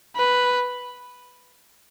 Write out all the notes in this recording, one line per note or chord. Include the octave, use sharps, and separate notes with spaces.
B4